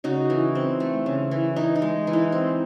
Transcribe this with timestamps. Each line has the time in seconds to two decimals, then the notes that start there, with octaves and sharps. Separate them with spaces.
0.04 C#3 D#4 F#4
0.30 E3
0.55 C4
0.80 A3
1.06 C#3
1.31 E3
1.56 E3 D#4
1.75 D#4
1.82 G#3
2.07 E3
2.13 D#4
2.32 C4